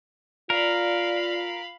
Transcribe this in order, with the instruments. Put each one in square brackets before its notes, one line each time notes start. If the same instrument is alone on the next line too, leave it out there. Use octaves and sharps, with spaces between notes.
[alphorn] F4 [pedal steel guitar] A#4 [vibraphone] D5 [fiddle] F5 B5